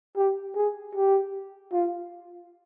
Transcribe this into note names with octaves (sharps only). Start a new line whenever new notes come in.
G4
G#4
G4
F4